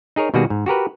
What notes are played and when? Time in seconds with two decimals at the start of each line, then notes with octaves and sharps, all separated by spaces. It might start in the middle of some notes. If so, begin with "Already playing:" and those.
0.16 D#4 G#4 A#4 C#5
0.34 B2 D#3 G3 A#3 F#4 G#4
0.50 G#2
0.66 F#4 G4 A#4 B4